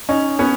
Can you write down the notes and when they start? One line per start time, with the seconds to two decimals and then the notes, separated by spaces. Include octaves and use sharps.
0.09 C#4 D#4
0.39 B3 C#4